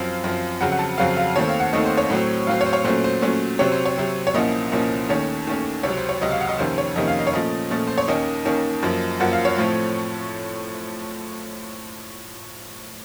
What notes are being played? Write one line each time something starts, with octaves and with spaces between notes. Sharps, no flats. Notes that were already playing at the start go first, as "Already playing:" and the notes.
Already playing: F#2 F3 C4 F5
F#2 F3 C4
F2 C#3 F#3 C4 F#5
F#5
A5
F2 C#3 F#3 C4 F5
F5
D#2 D#3 A3 C4 C#5
F5
F#5
D#2 D#3 A3 C4 D#5
C5
C#5
A2 F#3 C4
A2 F#3 C4 F5
C#5
C5
C#5
A#2 F#3 A3 C#4 C5
C5
A#2 F#3 A3 C#4
C3 F#3 C4 C#5
C5
C#5
C3 F#3 C4
C#5
C2 A#2 F3 A#3 C#4 D#5
C2 A#2 F3 A#3 C#4
D#2 D#3 A3 C#4 C#5
D#2 D#3 A3 C#4
C#2 C3 F#3 C#5
C5
C#5
C#2 C3 F#3 D#5
F5
F#5
D#5
F2 C3 D#3 A#3 C#4 C5
C#5
F2 C3 D#3 A#3 C#4 D#5
F5
D#5
C#5
A#2 F3 A3 C#4 D#5
A#2 F3 A3 C#4
C5
C#5
D#2 D#3 A#3 C#4 D#5
D#2 D#3 A#3 C#4
F#2 F3 A#3
F#2 F3 A#3 F#5
F5
C#5
A2 F3 A3 C4